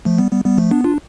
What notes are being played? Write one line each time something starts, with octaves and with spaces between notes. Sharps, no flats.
F3 A3
G3 B3
G3 B3
G3 B3
F3 A3
B3 D4
D4 F4